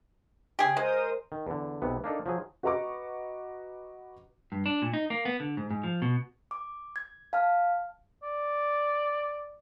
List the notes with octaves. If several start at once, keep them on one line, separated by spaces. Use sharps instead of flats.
C#3 G4 G#4
G#3 A#4 C5 D#6
D#3
E2 D3
B1 C3 B3
A#3 D4 D#4 A4
F3 F#3 G#4
F#4 B4 D#5 A#5 C#6 D6
G2
D4
A#2
D#4
A#3
B3
D3
G#2
G#2
F3
B2
D6
G#6
F5 A5 F6
D5